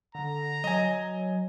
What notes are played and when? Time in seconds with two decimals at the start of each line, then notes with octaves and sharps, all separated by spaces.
0.15 D3 A#5
0.64 F#3 D#5 G#5